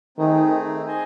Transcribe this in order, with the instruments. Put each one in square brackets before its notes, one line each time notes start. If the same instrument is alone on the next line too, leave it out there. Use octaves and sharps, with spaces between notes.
[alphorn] D#3 [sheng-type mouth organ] A3 C4 D#4 G#4
[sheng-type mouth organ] G#4 C5 D#5 G#5